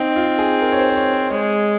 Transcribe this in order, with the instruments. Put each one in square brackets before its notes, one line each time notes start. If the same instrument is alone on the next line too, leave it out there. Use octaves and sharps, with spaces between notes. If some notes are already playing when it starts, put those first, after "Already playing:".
Already playing: [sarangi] C4 [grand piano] D#4
[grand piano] F4
G#4
A#4
C#5
C5
C5
C#5
C5
[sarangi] G#3 [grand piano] C#5